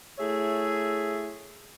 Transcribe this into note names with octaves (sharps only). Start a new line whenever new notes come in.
A3 E4 G#4 C#5 E5